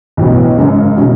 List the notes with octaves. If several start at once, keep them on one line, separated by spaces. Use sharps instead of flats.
B1 A2 F#3 B3
G#1 F#2 C#3 G#3
B2 G#3 C#4 E4